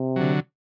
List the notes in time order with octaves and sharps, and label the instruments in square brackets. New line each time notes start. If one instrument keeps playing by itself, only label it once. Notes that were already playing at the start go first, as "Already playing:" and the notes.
Already playing: [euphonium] C3
[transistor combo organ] D3 F#3